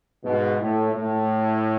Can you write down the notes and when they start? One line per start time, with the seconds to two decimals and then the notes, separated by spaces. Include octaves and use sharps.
0.24 G#2 B2
0.60 A2
0.95 A2